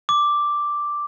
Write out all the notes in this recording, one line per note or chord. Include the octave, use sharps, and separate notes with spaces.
D6